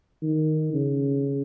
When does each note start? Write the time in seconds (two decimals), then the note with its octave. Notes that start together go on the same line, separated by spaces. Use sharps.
0.22 D#3
0.74 C#3